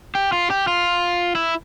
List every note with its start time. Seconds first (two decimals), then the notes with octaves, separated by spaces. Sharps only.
0.15 G4
0.32 F4
0.50 G4
0.68 F4
1.35 E4